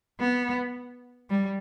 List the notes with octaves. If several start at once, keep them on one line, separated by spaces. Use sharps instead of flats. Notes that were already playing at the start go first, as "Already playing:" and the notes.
B3
G3